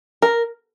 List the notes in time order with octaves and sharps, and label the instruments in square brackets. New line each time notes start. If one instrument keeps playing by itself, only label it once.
[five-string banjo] A#4